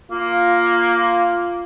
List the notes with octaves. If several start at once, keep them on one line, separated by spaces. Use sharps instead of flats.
A#3 F4